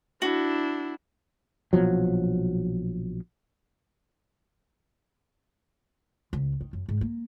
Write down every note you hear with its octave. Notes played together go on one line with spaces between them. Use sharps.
D4 E4 F#4
A#1 B2 F3 F#3
C#2
D#3
F#2
G#2
A#3